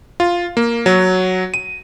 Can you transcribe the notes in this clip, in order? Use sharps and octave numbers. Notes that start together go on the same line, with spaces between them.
F4
A#3
F#3
D#7